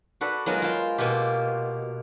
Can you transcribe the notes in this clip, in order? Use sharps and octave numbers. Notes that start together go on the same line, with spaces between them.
F#4 A4 B4 D5
F#3 G#3 B3 F4 F#4 A#4
F4 C5
B2 A#3 F4 G4